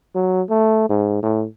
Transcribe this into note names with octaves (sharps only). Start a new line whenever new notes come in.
F#3
A3
G#2
A2